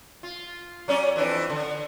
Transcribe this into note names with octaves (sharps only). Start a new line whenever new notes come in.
F4
F#3 C#4 D5
F2 E3 D4
D3